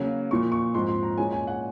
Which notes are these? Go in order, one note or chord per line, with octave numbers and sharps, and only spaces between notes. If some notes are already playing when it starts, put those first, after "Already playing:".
Already playing: C#3 F#3 A#3
A#2 F3 A#3 C#6
C#6
G#2 F3 C4 C6
C6
A#5
A#2 G#3 C#4 G#5
G#5
F#5